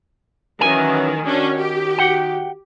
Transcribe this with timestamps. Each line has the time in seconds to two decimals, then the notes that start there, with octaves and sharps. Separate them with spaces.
0.61 D#3 E3 F#3 C#4 G#5
1.26 D#3 C#4 D4 F#4
1.57 G4
1.98 F#5 G5